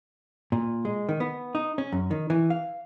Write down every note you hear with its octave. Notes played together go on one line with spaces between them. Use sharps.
A#2
G#3
D#3
B3
D#4
C#4
F#2
D#3
E3
F5